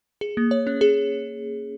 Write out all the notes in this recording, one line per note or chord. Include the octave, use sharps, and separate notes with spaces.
G#4
A#3
C#5
C#4
G#4